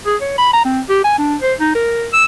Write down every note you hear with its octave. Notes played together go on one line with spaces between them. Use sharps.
G#4
C#5
B5
A#5
C4
G4
G#5
D4
C5
D#4
A#4
E6